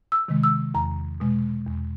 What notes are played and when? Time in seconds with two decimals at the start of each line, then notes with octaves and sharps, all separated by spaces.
0.12 E6
0.28 C3 D#3 G#3
0.44 E6
0.74 E2 A#5
1.20 B2 G#3
1.66 E2